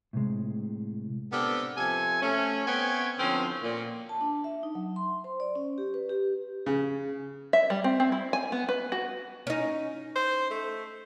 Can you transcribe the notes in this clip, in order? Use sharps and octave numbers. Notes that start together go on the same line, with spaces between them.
A2 C3 G#3
B3 C4 D4 G4 A4 A#4
C3 F3 A4 G#5
A3 C#4
B3 C4 B4 C#5 G5 G#5
D3 E3 F3 C4 C#4
A#2
A5
D4
E5
D#4
F#3
C6
C5
D5
C#4
G4
B4
G4
C#3
E5
G3
C4
C4
E4
G#5
B3
B4
F#4
C#4 D#4
C5
A3